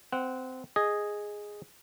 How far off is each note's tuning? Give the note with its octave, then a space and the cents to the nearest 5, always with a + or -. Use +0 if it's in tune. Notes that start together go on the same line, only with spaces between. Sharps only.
C4 -20 F#5 +0
G#4 +0 D#5 +0